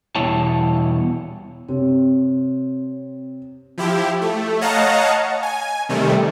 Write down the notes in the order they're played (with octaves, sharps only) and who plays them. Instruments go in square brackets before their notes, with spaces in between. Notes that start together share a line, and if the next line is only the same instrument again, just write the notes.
[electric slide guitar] E2 B2 G3 E4 C#5 A5
[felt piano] C3 [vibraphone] C4 C#5
[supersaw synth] F3 E4 G4
A3
C#5 D#5 F5 F#5 A5 A#5
G#5
C3 D#3 G3 A3